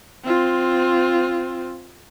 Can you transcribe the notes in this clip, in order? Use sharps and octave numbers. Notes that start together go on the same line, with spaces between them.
C4 F4